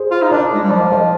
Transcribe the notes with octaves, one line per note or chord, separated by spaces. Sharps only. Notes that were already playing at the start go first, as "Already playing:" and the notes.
Already playing: G#4 C5
F4
D#4
D4 A#4 D5
G#3
G3
F3 D#5
F5
C5 D#5